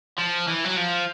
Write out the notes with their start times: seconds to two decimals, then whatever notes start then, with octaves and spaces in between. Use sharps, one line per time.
0.19 F3
0.48 E3
0.65 F#3
0.77 F3